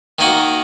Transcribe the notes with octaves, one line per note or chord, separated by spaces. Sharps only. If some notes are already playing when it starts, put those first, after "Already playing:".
D#3 A#3 D#4 F#4